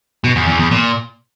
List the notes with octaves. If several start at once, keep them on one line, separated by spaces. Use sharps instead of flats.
B2
E2
E2
E2
A#2